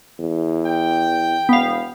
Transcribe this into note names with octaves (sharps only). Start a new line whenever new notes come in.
E2
G5
E1 B3 F5